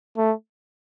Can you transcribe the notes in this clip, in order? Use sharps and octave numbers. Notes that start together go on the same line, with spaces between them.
A3